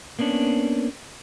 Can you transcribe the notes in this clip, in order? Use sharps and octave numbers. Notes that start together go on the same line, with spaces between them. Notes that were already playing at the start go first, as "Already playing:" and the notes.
A#3 B3 C#4 D4